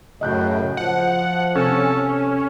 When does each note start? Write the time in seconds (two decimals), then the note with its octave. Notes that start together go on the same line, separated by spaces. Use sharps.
0.21 F#2 A2 C#3 D#5 F#6 G6
0.77 F3 F#5
1.55 C3 C#4 A4